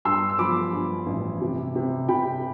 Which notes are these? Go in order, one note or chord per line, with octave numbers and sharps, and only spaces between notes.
G2 C6 E6
E6
F3 B5 D6
G2
A1
C3
C3
C3 G5 B5